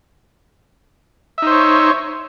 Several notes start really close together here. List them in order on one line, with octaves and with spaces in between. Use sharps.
E5 D#4 C5 C#5